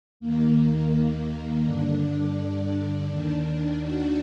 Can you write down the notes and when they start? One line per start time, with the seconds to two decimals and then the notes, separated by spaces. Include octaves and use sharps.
0.20 D#2 D#3 A#3
1.64 G2 D3 D4
3.09 D#2 D#3
3.81 F#4